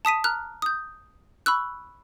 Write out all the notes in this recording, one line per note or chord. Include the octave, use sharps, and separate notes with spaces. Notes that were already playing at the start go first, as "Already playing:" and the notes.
A5 D#6 B6 D#7
A#5 F6 F#6
D#6 G6
B5 C#6 E6 F#6